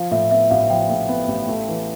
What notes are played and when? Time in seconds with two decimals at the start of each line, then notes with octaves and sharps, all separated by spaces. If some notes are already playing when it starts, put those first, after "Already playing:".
Already playing: F3 F5
0.11 A2 E5
0.31 B3 E5
0.51 A1 F5
0.70 F3 G5
0.89 A2
1.09 B3
1.28 A1
1.48 A3
1.68 E3